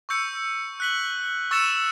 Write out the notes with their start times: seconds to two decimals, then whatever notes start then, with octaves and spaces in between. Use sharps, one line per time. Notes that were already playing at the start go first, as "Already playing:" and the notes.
0.09 C#6 E6 G6 C#7
0.80 F#6 B6 F#7
1.51 C#6 E6 A6 C#7 E7